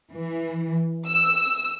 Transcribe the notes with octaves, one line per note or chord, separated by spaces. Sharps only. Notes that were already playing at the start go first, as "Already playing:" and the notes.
E3
E6